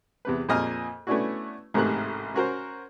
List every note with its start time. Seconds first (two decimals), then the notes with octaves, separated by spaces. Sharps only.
0.25 E2 C3 B4
0.49 F2 A#2 G#4 D#5 G#5 F6
1.07 A3 B3 C#4 D4 E4 F#4
1.74 A1 G#2 C3 A3 A#4 F#6
2.34 C#4 F#4 A#4 C5